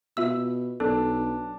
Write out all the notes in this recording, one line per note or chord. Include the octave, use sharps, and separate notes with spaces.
B2 F4 E5 E6
B1 D4 A4